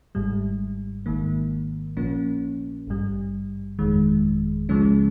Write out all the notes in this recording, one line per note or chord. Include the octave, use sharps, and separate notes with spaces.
G#1 G#2 G3
G#1 G#2 D#3 A#3
A#1 A#2 F3 A#3 C#4
G#1 G2 G3
G1 F2 D#3 G#3
C#2 C#3 F3 G#3 C#4